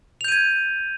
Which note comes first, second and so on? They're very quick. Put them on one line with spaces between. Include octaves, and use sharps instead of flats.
F7 G6 D#7 G#6